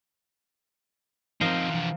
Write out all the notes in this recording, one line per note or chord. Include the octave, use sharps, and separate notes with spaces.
F3 C4 D#4 A#4 C5
E3 D4